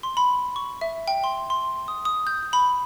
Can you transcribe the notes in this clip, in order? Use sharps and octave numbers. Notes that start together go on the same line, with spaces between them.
C6
B5
C#6
E5
G5
C6
C6
D#6
D#6
G6
B5